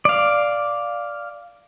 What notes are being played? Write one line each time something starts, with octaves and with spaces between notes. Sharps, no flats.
D5 F5